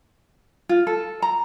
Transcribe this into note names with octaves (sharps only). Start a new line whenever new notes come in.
F4
A4
A#5